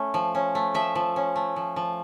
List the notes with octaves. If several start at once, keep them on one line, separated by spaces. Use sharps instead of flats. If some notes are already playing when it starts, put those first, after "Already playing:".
Already playing: A3 C#4
F3
C#4
A3
F3 E5
F3
C#4
A3
F3
F3